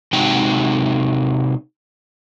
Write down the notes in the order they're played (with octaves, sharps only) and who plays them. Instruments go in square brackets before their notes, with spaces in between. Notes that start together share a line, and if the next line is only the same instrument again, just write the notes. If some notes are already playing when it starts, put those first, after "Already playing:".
[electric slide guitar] C3 G#3 D#4 F#4 G5